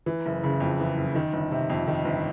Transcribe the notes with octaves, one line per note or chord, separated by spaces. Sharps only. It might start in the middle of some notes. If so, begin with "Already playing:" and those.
E3
F#1
C#3
F2
E3
F#1
D#3
G1
C3
F2
D#3
G1